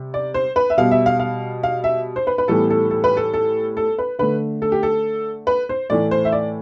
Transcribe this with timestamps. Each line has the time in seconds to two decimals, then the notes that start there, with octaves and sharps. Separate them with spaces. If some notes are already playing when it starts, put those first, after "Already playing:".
Already playing: C3 G3
0.14 D5
0.34 C5
0.56 B4
0.70 E5
0.77 B2 G3 B3 F5
0.91 E5
1.06 F5
1.20 F5
1.63 F5
1.84 E5
2.16 C5
2.27 B4
2.38 B4
2.48 A2 E3 G3 B3 A4
2.70 A4
2.91 A4
3.04 B4
3.17 A4
3.34 A4
3.77 A4
3.98 B4
4.19 D3 A3 B4
4.62 A4
4.72 G4
4.83 A4
5.47 B4
5.69 C5
5.90 A2 E3 A3 D5
6.11 C5
6.25 E5
6.32 D5